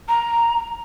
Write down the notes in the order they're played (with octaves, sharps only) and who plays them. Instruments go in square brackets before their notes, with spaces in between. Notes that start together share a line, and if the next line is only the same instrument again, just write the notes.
[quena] A#5